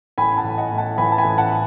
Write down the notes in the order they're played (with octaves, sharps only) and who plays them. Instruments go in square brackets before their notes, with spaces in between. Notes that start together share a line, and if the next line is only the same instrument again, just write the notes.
[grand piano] A1 G#5 B5
F#5 A5
A1
D#5 F#5
A2
F#5 A5
E3 G#5 B5
A5
G#5 B5
A1
F#5 A5